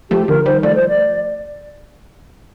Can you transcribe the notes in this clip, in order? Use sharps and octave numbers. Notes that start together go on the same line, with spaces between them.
F3 A3 G4
D3 F3 A#4
D#3 G3 C5
F3 A3 D5
C5
D5